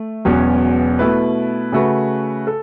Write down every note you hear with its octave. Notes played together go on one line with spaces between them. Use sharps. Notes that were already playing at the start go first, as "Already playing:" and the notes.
Already playing: A3
E1 E2 B2 F#3 C#4
B2 A3 E4 B4
C#3 A3 F#4 B4
A4